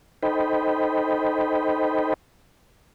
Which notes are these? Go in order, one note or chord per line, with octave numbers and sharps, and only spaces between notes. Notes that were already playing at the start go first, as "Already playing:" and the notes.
D#4 A4 C5 D#5 G5 B5